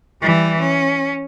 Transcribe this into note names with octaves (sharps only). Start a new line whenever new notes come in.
E3 G3
C#4